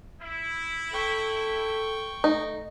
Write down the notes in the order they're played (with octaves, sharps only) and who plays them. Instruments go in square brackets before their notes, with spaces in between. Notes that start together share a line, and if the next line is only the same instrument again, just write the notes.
[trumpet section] E4
[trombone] A4 [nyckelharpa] G5 C#6
[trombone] A3 [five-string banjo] D#4